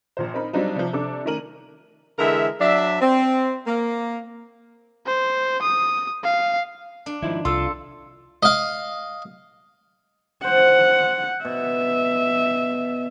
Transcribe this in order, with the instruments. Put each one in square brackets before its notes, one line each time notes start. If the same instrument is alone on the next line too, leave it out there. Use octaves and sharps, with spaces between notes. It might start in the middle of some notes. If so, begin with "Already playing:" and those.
[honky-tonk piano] A#1 A#2 C5
C4 D#4 A#4 B5
F#3 G3 C4 D4 D#4 F4
C3 F3
C3 D4 A4 D6
D#3 A3 C#4 A#4 D#7 F#7
[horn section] D3 E3 G#3 A#4 E5
F#3 D4 E5
C4
A#3
[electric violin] C5
D#6
F5
[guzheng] D4
[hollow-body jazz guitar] G#2 F3 E4 [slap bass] D#3
[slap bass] C2 [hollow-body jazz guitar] F4 [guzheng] A4 [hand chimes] C6 E6
[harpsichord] D#5 F5
[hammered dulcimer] C5 [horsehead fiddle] F#5
[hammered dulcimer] B2 [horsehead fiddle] E5